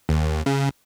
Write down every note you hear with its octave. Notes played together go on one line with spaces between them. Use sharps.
D#2
C#3